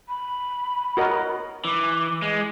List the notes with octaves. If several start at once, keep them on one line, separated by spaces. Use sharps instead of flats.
B5
F#4 A#4 D#5
E3 D6
G#3